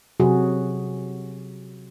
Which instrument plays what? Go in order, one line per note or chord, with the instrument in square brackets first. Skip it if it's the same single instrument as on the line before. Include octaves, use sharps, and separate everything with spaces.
[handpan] C3 F#3 F#4 G#4